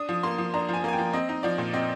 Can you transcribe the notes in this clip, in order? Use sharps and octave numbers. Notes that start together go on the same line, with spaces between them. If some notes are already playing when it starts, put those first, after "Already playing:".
Already playing: D4 D#6
F3
A#3 C6
F3
D4 A#5
F3 G#5
A#3 G#5
G5
F3
C4 D#5
D#4
F3 D5
A#2
C4 D#5